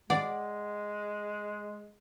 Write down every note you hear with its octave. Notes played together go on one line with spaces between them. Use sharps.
G#3 D5 F#5